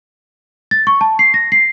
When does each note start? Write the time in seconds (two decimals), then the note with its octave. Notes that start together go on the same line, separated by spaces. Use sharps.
0.71 A6
0.87 C#6
1.01 A5
1.19 C7
1.34 A#6
1.52 C7